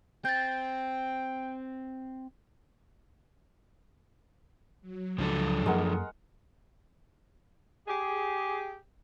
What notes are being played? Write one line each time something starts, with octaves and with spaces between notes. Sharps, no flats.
C4 G5 G6 A6
F#3
C#2 F3 D4 A4
F#2 G#3 A#3 A#4 F#5
G4 G#4